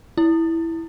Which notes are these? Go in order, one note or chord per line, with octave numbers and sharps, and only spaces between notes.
E4